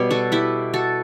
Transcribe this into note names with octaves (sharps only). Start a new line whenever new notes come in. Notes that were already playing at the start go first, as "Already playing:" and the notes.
Already playing: B2 G3 B3 C#5
F#4 A4
E4 G4
F#4 A4